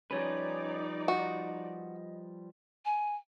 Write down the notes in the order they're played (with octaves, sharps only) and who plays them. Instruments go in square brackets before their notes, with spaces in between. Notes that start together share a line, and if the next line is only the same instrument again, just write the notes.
[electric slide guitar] F3 G3 B4 [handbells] C#4 C#5 [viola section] D#4 D5
[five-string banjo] F#4 [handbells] D#5
[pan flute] G#5